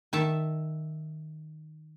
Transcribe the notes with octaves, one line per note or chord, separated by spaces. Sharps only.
D#3 E5 A5